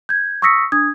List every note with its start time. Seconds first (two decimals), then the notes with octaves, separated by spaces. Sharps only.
0.09 G6 G#6
0.42 C#6 D#6 E6 A#6 B6 C#7
0.72 D4 D#6 G#6